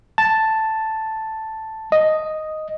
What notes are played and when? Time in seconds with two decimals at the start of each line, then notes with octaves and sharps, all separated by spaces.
0.18 A5
1.92 D#5